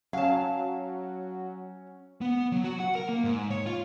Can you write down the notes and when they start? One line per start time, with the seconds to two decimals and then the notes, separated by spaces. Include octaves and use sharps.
0.13 F#3 C#4 F5 A5
2.21 B3
2.52 F#3
2.64 F#4
2.80 F#5
2.95 A#4
3.09 A#3
3.24 G#2
3.51 C#5
3.66 F4